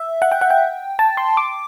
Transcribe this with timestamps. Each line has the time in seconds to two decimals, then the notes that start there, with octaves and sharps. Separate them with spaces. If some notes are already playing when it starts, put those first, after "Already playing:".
Already playing: E5
0.22 F#5
0.32 G5
0.41 F#5
0.50 G5
0.99 A5
1.17 C6
1.37 D6